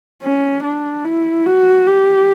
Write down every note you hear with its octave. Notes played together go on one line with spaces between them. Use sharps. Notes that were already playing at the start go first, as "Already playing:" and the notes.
C#4
D4
E4
F#4
G4